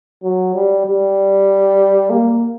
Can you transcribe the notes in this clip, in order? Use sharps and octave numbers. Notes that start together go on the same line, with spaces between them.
F#3
G3
G3
A#3